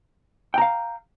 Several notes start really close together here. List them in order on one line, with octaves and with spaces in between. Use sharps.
G5 A#5 F5